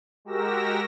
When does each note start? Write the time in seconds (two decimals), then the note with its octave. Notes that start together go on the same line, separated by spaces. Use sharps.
0.25 G#3 F#4 G4 A#4 E6 A#6